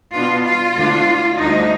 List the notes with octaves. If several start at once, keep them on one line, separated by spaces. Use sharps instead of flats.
B2 B3 D4 F4
F4
D2 D3 G#3 D4
D2 D3 G3 D4 D#4